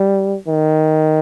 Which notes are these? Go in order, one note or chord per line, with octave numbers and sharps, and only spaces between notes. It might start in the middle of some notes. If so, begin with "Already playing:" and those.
Already playing: G3
D#3